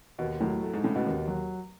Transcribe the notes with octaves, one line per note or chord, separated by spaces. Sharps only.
D#2 B2
A2 F#3
A3
G#2
A2 C#3
B2
D#2
F#3